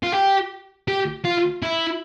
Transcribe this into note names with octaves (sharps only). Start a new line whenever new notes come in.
F4
G4
G4
F4
E4